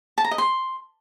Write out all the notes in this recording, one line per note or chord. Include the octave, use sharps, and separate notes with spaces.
A5
A#5
D#5
C6